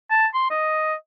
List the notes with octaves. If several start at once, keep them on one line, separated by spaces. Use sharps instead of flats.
A5
C6
D#5